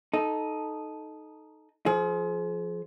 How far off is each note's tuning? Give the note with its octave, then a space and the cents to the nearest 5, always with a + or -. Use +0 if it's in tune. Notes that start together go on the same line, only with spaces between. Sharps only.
D#4 +0 A4 -15
F3 +0 G#4 +40